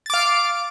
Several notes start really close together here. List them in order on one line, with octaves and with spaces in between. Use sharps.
A6 D6 F5